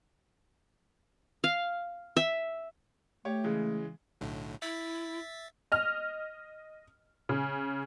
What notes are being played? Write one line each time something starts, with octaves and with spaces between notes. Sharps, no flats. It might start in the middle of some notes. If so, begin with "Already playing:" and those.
F5
E5
A3 G4 C#5
C#3 E3 G#3
B1 A2 D3
E4 E5 A6 B6
D#5 F6
C#3